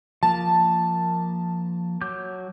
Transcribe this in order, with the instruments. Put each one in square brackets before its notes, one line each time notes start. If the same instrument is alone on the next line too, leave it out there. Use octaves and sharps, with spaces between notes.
[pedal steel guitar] F3 A#3 [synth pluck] A5
[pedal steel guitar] F#3 D6 G6